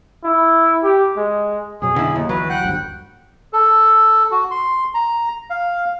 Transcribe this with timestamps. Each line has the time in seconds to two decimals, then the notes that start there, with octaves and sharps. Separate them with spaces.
0.24 E4
0.84 G4
1.17 G#3
1.82 F2 B2 F#3 G#4
1.96 D3 E4
2.16 D#2
2.29 D2 E3 F#3 B4
2.49 F#5 G5 F#6
2.63 G1 D2 G2
3.53 A4
4.31 F#4
4.51 C6
4.94 A#5
5.50 F5